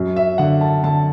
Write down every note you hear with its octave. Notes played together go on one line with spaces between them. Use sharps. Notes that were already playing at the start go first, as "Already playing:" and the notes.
Already playing: F#2
E5
D3 F#5
A5
D3 A5